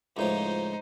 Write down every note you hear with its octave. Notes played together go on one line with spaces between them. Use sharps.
C#2 A2 F3 D#4 C5